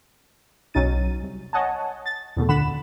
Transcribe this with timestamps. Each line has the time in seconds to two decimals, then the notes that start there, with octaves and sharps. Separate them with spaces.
0.74 B1 F#3 C#4 D#4 A6 D#7
1.23 C2
1.53 C#5 D#5 F#5 G#5 A5
2.06 A6
2.36 E2 B2 A3
2.48 D2 A#2 D3 F#5 B5 E7